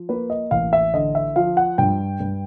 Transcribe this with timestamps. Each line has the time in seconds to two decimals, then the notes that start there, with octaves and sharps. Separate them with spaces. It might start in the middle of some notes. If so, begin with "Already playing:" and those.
Already playing: F3
0.09 A#3 B4
0.30 D#5
0.51 A1 F5
0.73 E5
0.94 D3 D#5
1.15 E5
1.36 F3 F5
1.57 F#5
1.78 G2 G5
2.20 G2